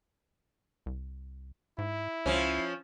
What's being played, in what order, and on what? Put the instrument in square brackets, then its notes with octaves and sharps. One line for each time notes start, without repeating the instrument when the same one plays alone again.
[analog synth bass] C2
[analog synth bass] G#2 [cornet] E4
[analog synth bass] C#2 [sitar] F3 C#4